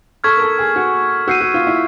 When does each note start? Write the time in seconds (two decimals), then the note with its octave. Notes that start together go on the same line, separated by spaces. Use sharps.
0.24 A4 C#6 F6 G#6 B6
0.37 A#4
0.42 A4
0.59 G#4
0.76 F#4
1.28 F#4 E6 G6 C7 D#7
1.41 F#4
1.54 F4
1.67 E4